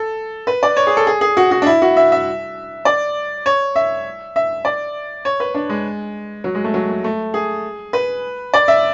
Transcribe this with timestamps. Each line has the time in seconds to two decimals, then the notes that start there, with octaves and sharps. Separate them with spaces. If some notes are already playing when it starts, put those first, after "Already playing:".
Already playing: A4
0.47 B4
0.63 D5
0.77 C#5
0.87 G#4
0.97 A4
1.07 G#4
1.21 G#4
1.37 F#4
1.51 F#4
1.62 D4
1.66 E4
1.82 F#4
1.97 E5
2.12 E5
2.85 D5
3.46 C#5
3.76 E5
4.36 E5
4.65 D5
5.25 C#5
5.40 B4
5.54 D4
5.70 G#3
6.44 F#3
6.55 G#3
6.64 A3
6.74 F#3
6.89 A3
7.04 A3
7.34 G#4
7.93 B4
8.54 D5
8.68 E5